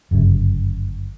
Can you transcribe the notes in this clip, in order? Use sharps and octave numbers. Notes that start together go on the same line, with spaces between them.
G1 F#2 C#3